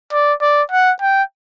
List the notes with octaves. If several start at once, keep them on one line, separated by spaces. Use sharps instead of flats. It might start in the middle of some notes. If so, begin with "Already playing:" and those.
D5
D5
F#5
G5